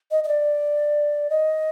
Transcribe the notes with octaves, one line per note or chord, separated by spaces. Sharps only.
D#5
D#5
D5
D#5